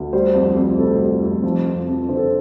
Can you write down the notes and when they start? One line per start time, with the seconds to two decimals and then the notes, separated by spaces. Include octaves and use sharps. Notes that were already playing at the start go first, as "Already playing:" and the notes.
Already playing: D2
0.13 G3 C5
0.35 F2
0.56 F2
0.78 C3 A4
1.00 G3
1.22 F2
1.43 F3
1.66 F2
1.88 F2
2.08 D3 C5
2.17 A4